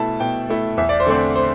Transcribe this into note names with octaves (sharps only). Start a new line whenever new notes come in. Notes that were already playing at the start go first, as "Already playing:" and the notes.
Already playing: B2 A3 E4 A5
B2 G5
A3 E4
E2 E5
D5
C5
D3 A3 C4 D5
C5